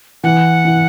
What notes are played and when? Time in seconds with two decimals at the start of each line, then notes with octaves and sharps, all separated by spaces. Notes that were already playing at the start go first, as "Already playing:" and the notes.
0.24 E3 F#5
0.65 E3